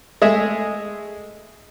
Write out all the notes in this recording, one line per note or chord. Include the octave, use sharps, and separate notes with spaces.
G#3 A3 G#4 E5